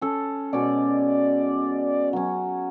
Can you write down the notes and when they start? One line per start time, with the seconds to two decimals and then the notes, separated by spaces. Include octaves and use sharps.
0.01 C#4 A4
0.53 B2 G#3 C#4 D5
2.13 F#3 C#4